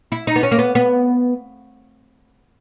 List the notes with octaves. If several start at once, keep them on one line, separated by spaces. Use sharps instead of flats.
E4
D#4
B3
C#4
A#3
B3
B3